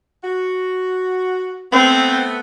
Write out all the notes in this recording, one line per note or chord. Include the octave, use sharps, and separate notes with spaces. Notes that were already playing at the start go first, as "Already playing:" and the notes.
F#4
A3 B3 C4